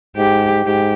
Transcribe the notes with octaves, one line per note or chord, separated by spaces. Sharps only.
G#2 G4
G#2 G4